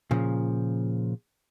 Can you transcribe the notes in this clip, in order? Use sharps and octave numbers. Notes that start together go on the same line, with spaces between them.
A#2 C#3 F3